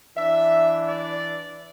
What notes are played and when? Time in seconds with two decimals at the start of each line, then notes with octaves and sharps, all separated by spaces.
0.15 E3 D4 E5
0.88 D5